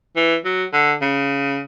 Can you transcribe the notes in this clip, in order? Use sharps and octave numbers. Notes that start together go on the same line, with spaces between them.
E3
F#3
D3
C#3